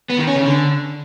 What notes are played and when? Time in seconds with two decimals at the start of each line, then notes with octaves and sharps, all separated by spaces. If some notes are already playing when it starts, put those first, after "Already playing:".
0.10 B3
0.18 D#3
0.27 C#4
0.36 C#3
0.45 D3